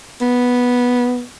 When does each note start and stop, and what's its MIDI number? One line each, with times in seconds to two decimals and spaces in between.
0.21 1.23 59